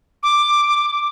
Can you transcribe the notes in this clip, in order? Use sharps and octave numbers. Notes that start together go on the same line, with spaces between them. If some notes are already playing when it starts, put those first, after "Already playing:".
D6